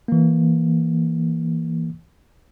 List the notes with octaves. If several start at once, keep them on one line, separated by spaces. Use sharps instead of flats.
E3 A#3